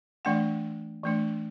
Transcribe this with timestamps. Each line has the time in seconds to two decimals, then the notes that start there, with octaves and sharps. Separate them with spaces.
0.25 E3 A3 D4 F#5
1.04 E3 A3 D4